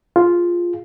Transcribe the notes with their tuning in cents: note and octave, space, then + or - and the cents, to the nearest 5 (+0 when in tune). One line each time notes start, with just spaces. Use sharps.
F4 +0 G#4 +0